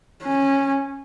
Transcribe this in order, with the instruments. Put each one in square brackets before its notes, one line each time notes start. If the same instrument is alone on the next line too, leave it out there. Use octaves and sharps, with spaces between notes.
[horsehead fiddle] C#4